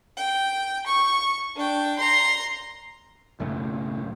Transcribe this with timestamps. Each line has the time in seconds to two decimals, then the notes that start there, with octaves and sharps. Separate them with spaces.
0.17 G5
0.87 C#6
1.56 D4 G5
1.99 A#5 C6
3.40 B1 F#2 A2 C#3